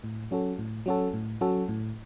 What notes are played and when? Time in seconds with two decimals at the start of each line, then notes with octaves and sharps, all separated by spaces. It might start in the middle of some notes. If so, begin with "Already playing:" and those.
0.04 A2
0.31 F#3 C#4 F#4 A4
0.59 A2
0.86 F#3 C#4 F#4 A4
1.14 A2
1.41 F#3 C#4 F#4 A4
1.69 A2